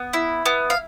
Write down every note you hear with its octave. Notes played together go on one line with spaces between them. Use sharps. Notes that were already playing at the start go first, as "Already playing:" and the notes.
Already playing: B3
E4
B3
F5